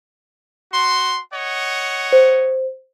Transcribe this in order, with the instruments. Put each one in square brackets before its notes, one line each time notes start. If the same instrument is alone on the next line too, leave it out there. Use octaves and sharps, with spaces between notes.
[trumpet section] F#4 C6
C#5 D#5 F#5
[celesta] C5